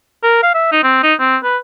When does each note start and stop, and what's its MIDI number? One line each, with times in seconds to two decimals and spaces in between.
0.23 0.38 70
0.43 0.54 77
0.54 0.68 76
0.72 0.80 63
0.83 1.03 60
1.03 1.14 63
1.19 1.37 60
1.43 1.57 71